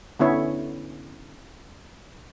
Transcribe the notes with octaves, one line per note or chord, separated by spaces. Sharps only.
D3 B3 C#4 E4 C#5